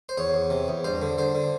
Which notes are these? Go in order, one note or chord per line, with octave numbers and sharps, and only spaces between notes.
C5
E2 C#5
E2
C3
E2
G2 C5
D3
D3 C5
D3